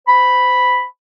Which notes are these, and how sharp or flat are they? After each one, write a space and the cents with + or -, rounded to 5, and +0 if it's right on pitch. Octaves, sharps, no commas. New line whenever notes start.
C5 -25 B5 +0